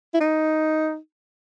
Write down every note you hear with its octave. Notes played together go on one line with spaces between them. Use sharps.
E4
D#4